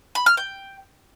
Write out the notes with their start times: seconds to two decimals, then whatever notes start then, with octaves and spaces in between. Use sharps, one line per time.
0.15 B5
0.26 F6
0.37 G5